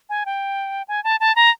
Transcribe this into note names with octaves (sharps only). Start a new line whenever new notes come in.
G#5
G5
G#5
A5
A5
A#5